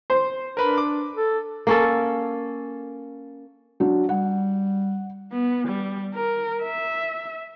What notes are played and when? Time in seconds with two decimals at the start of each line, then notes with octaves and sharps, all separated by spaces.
0.10 C5
0.57 D4 A#4 B4 B5
0.78 D6
1.15 A4
1.67 A#3 C#4 A4
3.80 F#3 D4
4.09 G3 F#5
5.32 B3
5.68 G3
6.14 A#4
6.62 E5